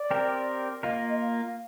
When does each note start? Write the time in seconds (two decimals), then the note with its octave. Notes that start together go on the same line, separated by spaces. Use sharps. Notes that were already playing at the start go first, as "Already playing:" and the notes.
Already playing: D5
0.11 C4 G4 A#4
0.82 A#3 F4 A#4 D#5
1.09 D#5
1.19 F5